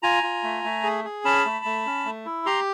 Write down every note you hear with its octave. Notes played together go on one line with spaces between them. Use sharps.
F4 G#5 A#5
F4
A3
A3
G#4
G#4
C#4 A5 B5
A3
A3
C#4
A3
E4
G4 A#5 C6